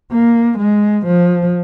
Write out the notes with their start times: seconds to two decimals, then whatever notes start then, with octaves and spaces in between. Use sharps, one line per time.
0.12 A#3
0.59 G#3
1.06 F3